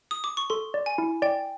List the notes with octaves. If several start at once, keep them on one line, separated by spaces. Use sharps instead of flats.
D#6
D6
C#6
A4 C6
D5
G#5
E4
D5 G5